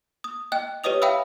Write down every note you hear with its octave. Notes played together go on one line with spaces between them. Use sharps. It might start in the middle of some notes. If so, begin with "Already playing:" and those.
D#6
D#5 G5 F#6
G4 B4 C#5 D#5 D#6 F7
E5 F5 G5 B5 D#6 E6